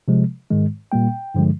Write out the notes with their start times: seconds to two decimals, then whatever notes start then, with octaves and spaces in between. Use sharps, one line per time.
0.08 C3 F3 G#3
0.50 G#2 D#3 G#3
0.92 A#2 G3 A#3 G5
1.35 G2 D3 F3 G#3